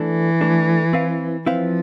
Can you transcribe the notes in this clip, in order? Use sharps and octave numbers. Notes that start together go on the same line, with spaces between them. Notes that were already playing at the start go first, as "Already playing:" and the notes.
Already playing: E3 A3 D4 A4
A3 D4 A4
C4 E4 B4 F5
F3 C4 E4 B4 F5